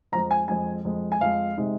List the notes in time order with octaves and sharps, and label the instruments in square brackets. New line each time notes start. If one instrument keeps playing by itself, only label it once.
[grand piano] F2 F3 G#3 A#5
G#5
F2 F3 G#3 G#5
F2 F3 G#3
G#5
F2 F3 G#3 F5
C3 G#3 D#4